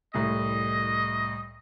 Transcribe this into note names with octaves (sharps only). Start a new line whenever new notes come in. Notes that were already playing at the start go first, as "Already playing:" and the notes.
C2 A2 D#5